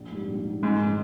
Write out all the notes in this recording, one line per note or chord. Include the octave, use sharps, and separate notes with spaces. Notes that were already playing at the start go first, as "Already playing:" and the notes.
Already playing: A#1
G#2 G3
A#1
G#2 G3
F1 G#2
D#3